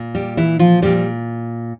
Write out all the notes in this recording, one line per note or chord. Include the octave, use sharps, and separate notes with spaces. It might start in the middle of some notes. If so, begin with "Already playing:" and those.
Already playing: A#2
G3 G4
E3 E4
F3 F4
A#2 F3 G3 G4